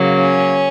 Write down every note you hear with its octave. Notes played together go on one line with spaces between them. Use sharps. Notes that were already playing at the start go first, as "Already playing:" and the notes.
Already playing: C#3 F#3 A#3
C#4